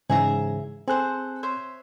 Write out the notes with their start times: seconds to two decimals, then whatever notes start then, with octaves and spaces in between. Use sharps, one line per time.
0.10 G#2 C#3 E3 G#4 E5 A#5
0.88 C4 G#4 A4 C5 F#6
1.43 C5 C#5 E5